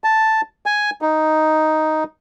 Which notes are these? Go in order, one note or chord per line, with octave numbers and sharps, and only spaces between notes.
A5
G#5
D#4